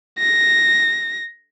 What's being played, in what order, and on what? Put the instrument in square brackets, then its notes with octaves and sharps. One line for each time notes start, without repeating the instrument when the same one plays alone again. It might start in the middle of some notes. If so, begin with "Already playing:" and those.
[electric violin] A#6